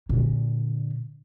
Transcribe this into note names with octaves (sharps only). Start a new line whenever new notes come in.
A#2 D3